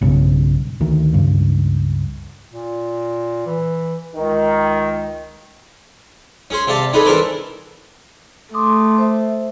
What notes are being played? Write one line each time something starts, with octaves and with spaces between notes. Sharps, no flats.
B1 G2 C#3
D2 D#3
C#2 G2
A#2
E3
C#2 D#3
C#4 G#4 C5
C3 G4 D5 F5 A5
C4 D4 D#4 G#4 A4 B4
E3 D4 A4 A#4 C5 D5
A3 C6 D6 D#6
C5 E5